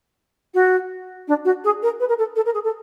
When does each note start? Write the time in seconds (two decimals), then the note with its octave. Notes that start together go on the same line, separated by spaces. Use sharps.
0.54 F#4
1.28 D4
1.45 F#4
1.64 G#4
1.82 A#4
2.00 B4
2.09 A#4
2.18 A4
2.36 A4
2.45 A#4
2.54 G#4
2.64 A4